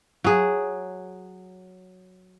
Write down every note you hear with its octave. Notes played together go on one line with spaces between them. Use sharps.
F#3 G#4